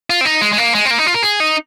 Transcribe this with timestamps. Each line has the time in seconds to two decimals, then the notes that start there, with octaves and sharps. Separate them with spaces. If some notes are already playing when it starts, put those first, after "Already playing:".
0.10 F4
0.21 C4
0.25 D#4
0.41 G#3
0.53 G#3
0.58 A#3
0.74 G#3
0.85 C4
0.91 A#3
0.99 D#4
1.07 F4
1.14 A#4
1.23 G#4
1.40 D#4